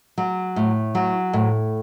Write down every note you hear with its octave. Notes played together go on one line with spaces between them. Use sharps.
F#3
A2
F#3
A2